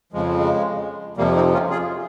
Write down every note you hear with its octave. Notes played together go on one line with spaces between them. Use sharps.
F2 C#3 F3 G#3
G#3
F2 C3 F3 G3 A#3
C4 D#4
C#4 F4
F4 G#4